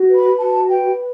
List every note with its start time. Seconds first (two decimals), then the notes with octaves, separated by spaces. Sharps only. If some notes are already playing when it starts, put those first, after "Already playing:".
Already playing: F#4
0.08 B4
0.16 B5
0.39 F#4 A5
0.70 B4 G5